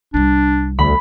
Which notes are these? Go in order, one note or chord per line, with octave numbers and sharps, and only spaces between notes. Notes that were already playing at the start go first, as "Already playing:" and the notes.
C2 G3 D4
D2 B5